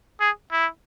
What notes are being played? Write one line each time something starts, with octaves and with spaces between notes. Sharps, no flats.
G#4
E4